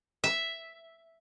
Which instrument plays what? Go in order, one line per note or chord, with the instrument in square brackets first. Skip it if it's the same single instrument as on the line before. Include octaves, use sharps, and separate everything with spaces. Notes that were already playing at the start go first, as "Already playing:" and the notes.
[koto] E5